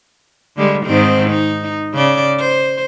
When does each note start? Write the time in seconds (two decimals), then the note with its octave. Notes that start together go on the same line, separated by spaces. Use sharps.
0.57 D3 G3 G#3
0.85 G#2 D#3 C4
1.30 D#4
1.94 C#3 D5
2.39 C5